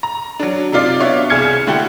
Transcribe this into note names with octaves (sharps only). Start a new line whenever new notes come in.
A#5
F#3 D4
C3 D#4 F4 D5 C7
B3 D4 F#4 C#5 E5 F5
C2 G#4 F6 G#6 C#7
D3 A3 E4 F#4 G4 A4